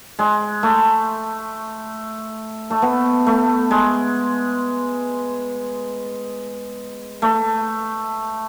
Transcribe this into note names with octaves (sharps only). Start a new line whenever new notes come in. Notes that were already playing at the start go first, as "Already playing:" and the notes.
G#3
A3
A3
B3
A3
G#3
A3